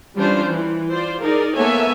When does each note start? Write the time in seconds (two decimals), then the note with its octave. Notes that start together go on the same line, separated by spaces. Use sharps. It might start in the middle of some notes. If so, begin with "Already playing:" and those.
0.16 E3 G3 C#4 D4 F4 C5
0.46 E3
0.90 F4 C5 D5
1.21 D#4 G#4 A#4 D5
1.56 A#3 B3 A4 C#5 E5 G#5